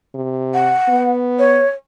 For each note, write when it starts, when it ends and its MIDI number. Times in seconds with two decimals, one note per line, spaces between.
0.15 0.75 48
0.54 1.12 78
0.89 1.64 59
1.39 1.70 73